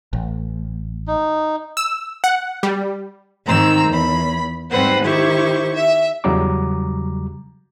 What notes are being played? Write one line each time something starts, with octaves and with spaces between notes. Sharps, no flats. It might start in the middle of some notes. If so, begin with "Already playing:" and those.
A1
D#4
E6
F#5
G3
G#2 D#3 C4 A#5 E6
E2 B5
G#2 G3 C4 B4 C5 F#5
D#3 E4 G4 C5 C#6
E5
E2 C#3 F#3 G3 A#5 D6